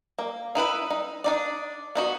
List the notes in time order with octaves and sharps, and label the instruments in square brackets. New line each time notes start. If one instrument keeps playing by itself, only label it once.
[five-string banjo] A#3
D#4 E4 B4 B5
D#4
D4 D#4 D5
B3 D#4 F#4